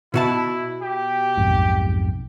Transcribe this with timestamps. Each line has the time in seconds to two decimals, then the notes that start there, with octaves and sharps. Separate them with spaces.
0.14 B2 E4 F#4 A5
0.82 G4
1.37 B1 F2 G#2